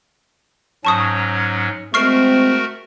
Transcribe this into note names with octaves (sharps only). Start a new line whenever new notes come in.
G#2 F#3 C#4 A5 C#6 D#6
G#3 A3 C4 F#4 A#4 C#6 F6 C7